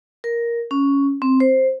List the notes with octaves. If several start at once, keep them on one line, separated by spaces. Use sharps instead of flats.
A#4
C#4
C4
C5